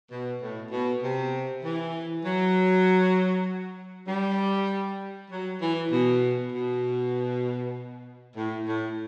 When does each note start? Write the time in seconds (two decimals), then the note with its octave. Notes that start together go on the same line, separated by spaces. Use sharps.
0.11 B2
0.42 A2
0.72 B2
1.03 C3
1.64 E3
2.25 F#3
4.08 G3
5.31 F#3
5.61 E3
5.92 B2
6.52 B2
8.36 A2
8.66 A2